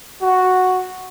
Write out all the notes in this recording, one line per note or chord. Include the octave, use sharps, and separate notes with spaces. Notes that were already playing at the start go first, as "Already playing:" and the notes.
F#4